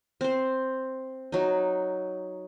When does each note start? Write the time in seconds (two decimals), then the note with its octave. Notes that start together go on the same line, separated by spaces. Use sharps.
0.21 C4 C5
1.32 F#3 D#4